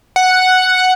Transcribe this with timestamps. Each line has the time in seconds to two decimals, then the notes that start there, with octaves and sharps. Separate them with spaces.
0.16 F#5